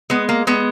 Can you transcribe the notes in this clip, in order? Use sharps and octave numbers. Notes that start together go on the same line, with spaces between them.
G#3 B3
A#3
G#3 B3